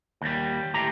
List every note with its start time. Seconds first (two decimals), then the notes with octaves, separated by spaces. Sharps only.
0.21 D#2 G3
0.74 A2 G4 A#5